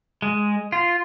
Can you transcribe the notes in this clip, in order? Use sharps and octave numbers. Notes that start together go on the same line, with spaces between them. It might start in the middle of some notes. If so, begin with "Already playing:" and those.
G#3
F4